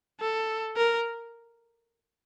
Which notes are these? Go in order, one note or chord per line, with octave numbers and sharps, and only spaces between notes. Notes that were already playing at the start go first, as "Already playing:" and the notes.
A4
A#4